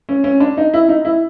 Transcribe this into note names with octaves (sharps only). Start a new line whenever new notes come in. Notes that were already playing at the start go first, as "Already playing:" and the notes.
C#4
C#4
D4
D#4
E4
D#4
E4